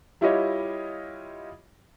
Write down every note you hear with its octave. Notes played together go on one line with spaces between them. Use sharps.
G3 E4 F4 G4 C#5 D#5